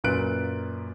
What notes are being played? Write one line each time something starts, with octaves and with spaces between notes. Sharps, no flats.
F#2 A#2 B4 F#6 D7